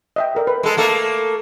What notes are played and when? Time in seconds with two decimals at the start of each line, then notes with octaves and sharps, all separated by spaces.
0.16 D#5 E5 G5
0.35 A4 A#4 D5
0.47 B4
0.63 G#3 A4
0.77 A3 A#3 A4